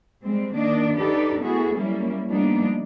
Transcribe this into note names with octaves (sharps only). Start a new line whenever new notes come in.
G3 G#3 C4
D#3 A#3 D4 D5 D#5
D4 D#4 G4 A4 B4 D5
A3 B3 E4 F#4 G#4 A4
F#3 G3 A#3 C#4 E4
F3 G3 A#3 B3 D4 D#4